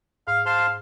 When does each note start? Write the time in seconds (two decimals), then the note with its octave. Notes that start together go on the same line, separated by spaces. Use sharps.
0.27 G#2 F5
0.46 C5 F5 A5 C6